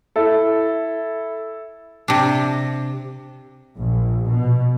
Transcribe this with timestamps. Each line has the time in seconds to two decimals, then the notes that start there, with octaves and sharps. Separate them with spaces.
0.16 E4 A4
2.08 C3 D4
3.78 A#1
4.27 B2